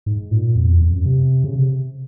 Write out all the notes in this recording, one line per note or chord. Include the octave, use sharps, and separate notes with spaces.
G#2
A#2
F2
E2
F2
F#2
C3
C#3
C3